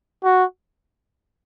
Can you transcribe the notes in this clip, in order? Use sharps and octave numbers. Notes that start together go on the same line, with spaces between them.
F#4